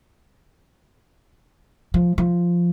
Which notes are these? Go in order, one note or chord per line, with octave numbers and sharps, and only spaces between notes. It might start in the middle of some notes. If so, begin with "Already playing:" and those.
F3
F3